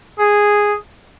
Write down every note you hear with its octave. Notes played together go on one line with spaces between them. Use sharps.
G#4